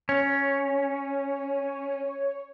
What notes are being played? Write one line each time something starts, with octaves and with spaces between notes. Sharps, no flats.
C#4 C#5